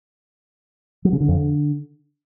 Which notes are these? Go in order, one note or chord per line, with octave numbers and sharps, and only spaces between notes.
F#3
C#3
D3
F2
D3